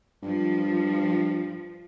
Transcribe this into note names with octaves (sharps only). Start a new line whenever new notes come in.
G2 F3